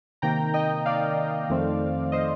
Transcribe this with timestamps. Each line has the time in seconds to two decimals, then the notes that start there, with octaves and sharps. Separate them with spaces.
0.22 C3 D#3 A#3 G5 A#5
0.54 D#5 G5
0.86 D5 F5
1.49 F2 D#3 A3 C4
2.12 C5 D#5